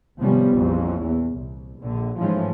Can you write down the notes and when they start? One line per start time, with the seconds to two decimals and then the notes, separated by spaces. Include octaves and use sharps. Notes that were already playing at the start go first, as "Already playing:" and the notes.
0.19 G#1 C3 F3 G3 B3 C#4
0.53 A#1 F2 E3 C#4
1.05 E2
1.36 C2
1.81 A#1 D3
2.18 G#2 E3 F3 G#3 A3 C#4